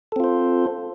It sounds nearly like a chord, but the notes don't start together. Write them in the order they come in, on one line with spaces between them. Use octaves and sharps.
A4 C4 F4 C5